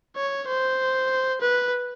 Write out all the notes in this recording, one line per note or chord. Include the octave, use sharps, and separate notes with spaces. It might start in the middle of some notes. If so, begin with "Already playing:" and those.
C#5
C5
B4